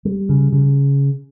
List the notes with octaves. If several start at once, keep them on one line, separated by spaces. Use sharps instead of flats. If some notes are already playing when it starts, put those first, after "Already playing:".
G3
C#3
C#3